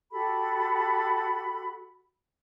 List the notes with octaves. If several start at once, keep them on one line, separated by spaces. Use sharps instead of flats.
F#4 G4 A4 B5